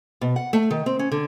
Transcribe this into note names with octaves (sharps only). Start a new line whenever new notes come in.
B2
F#5
A3
D#3
C4
C#4
D3